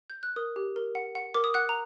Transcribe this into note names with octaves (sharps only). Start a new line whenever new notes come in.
G6
F#6
A#4 D#6
G4
A#4
F#5
F#5
A#4 D6
D#6
F#5 F#6
A#5